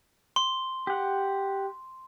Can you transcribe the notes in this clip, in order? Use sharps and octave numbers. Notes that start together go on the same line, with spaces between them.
C6
G4 F#5